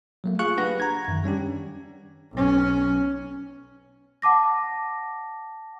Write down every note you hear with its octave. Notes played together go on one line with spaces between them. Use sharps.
F#3 A3 A#3
F4 G#4 F5 C#6 F#6
D4 G4 B4 F#5 A#6
A#5 G#6
F#2 D#3
G3 C#4 D4 G4
B1 C#4
F#5 A5 D6 A#6